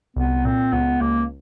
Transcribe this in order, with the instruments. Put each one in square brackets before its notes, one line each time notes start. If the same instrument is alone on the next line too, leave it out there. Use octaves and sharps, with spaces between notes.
[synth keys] C2 [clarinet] B3
[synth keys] A#2 [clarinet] C4
[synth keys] C#2 [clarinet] B3
[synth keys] C#2 [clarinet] A#3